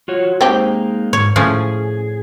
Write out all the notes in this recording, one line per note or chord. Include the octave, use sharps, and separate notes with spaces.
F4 F#4 C#5
G#3 A#3 C4 D#4 G4
G#2 C#5
A2 F3 C#4 G#4
G#4